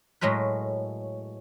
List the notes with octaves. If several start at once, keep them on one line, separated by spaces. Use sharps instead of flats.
A2 F#3 G#3 A#4 B4